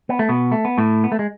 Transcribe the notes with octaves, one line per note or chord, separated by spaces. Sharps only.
B3
A3
B2 B3
A3
B3
A2 A3
B3
A3
G#3